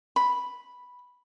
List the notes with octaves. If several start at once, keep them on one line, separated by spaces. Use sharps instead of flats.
B5